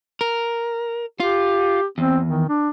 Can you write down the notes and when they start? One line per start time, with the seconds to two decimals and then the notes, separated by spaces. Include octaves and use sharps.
0.21 A#4
1.20 F4 G4
1.98 E2 C4
2.28 D#3
2.49 D4